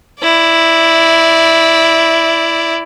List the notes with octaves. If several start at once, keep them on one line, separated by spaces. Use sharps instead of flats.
E4 D5